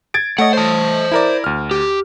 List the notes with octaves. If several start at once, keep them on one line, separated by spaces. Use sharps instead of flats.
G#6 A6 D7
A3 C#5 D#5 F#5
C5 A5
E4 A#4 D5
D2 F6
G4